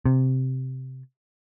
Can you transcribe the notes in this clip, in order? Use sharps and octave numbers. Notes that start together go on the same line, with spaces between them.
C3